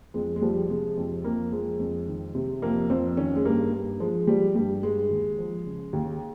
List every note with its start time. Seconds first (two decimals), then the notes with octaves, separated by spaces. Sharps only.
0.14 F2 G#3
0.36 G#3
0.42 F3 G3
0.69 C3 G#3
0.98 F2
1.24 F2 A#3
1.52 F3 G#3
1.80 F2
2.07 D#3
2.35 C3
2.62 F2 A#3
2.90 F2 C4
3.17 D#3 C#4
3.36 G#3
3.45 G2 A#3
3.73 G2
4.00 F3 G#3
4.27 F3 G3
4.55 G2 G3
4.83 G2 G#3
5.10 D#2
5.38 F3
5.66 C#3
5.93 D#2